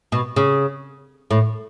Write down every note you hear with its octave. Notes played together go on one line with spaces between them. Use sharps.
B2
C#3
A2